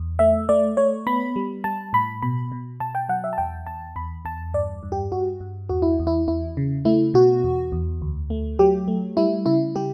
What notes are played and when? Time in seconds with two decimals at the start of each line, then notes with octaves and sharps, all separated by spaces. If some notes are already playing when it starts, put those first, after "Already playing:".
Already playing: E2
0.19 A3 E5
0.49 A3 D5
0.77 A3 C#5
1.07 B3 B5
1.36 G3
1.64 G3 A5
1.93 A2 B5
2.22 B2 B5
2.52 B2
2.80 B2 A5
2.95 G5
3.09 F#3 F#5
3.24 E5
3.33 A5
3.38 E2 G5
3.67 E2 A5
3.96 E2 B5
4.25 E2 A5
4.54 G2 D5
4.83 G2
4.92 G4
5.12 G2 F#4
5.40 G2
5.69 E2 F#4
5.82 E4
5.99 E2
6.07 E4
6.28 E2 E4
6.57 C#3
6.85 A3 E4
7.14 B2 F#4
7.44 E2
7.72 E2
8.02 D2
8.30 A3
8.59 F#3 G4
8.88 A3
9.17 G3 E4
9.46 C#3 E4
9.76 G3 G4